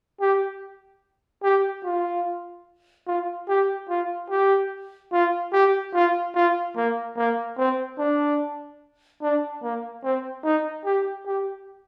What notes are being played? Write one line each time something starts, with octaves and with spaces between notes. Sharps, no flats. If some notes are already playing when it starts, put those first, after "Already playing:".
G4
G4
F4
F4
G4
F4
G4
F4
G4
F4
F4
A#3
A#3
C4
D4
D4
A#3
C4
D#4
G4
G4